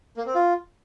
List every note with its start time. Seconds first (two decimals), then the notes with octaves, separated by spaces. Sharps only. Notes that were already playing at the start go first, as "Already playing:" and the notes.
0.17 A#3
0.26 C4
0.35 F4